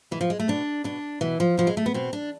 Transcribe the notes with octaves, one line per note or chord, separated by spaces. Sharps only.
B2 E3
F3
G#3
A3
B2 D4
B2 D4
B2 E3
F3
B2 F3
G#3
A3
B3
B2 C4
D4